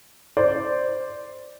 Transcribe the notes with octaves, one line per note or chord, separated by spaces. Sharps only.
C5 D5